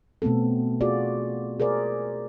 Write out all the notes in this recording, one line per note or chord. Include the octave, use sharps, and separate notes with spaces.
B2 A3 B3 C4 A4
F4 F#4 G#4 D5
G#4 A#4 C5 D5